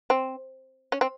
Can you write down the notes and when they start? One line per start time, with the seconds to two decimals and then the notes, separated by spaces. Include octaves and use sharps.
0.10 C4
0.92 C#4
1.01 C4